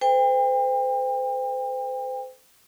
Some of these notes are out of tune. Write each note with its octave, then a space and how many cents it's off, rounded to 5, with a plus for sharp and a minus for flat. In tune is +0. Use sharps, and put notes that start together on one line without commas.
A4 +0 C5 -35 G5 +35